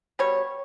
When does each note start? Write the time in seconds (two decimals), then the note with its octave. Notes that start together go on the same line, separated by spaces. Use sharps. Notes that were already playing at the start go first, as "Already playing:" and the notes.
0.19 B2 G3 C#5